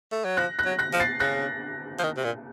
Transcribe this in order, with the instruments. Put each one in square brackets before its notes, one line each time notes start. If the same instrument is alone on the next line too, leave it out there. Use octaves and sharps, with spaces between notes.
[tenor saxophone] A3
F#3
[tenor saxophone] F3 [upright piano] F#6 A#6
[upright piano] F#6 A#6
[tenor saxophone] F#3
[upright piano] F#6 A#6
[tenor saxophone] F3
[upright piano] A6 C7
[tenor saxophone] C#3 [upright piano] F#6 A#6
[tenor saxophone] F3
D#3
C3
A#2